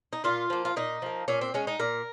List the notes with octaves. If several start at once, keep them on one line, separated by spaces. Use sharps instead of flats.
D#4
A#2 F4
F3 A#3
F4
A#2 D#4
F3 A#3
A#2 C#4
C4
G#3 C#4
D#4
A#2 A#4